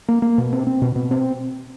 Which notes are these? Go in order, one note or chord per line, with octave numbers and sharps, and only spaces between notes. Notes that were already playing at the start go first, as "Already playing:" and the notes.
A#3
A#3
B2
C4
C4
B2
B2
C4